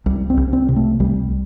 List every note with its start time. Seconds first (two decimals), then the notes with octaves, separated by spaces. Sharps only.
0.06 C2 G3
0.30 C4
0.37 C2
0.53 C4
0.69 C3
0.76 A3
1.00 C2 G3